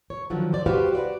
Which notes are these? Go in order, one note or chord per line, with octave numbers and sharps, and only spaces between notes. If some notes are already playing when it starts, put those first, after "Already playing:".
C#5
D3 D#3 F3 F#3
C5 D5
F#4 G4 B4 C5 F5
F#4 B4 D5 F#5